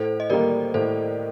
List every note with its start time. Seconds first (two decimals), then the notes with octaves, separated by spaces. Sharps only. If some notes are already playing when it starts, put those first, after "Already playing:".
Already playing: A2 A4 C5
0.20 D#5
0.30 G3 A#3 A#4 D5
0.74 A2 A4 C5